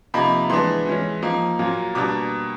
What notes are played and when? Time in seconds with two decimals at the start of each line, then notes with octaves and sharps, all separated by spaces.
0.14 C3 F3 A#3 D#4 B5
0.50 E3 G#3 B3 D4 C6
0.86 E3 G#3 C#4
1.22 F3 A#3 D#4
1.59 A#2 F#3 A#3
1.95 B2 G3 A#3 D4 D6